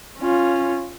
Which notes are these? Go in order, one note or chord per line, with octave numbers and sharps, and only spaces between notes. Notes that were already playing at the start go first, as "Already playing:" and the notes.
C#4 F4